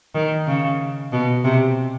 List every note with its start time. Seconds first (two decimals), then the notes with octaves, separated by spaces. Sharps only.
0.15 D#3
0.47 C#3
1.12 B2
1.44 C3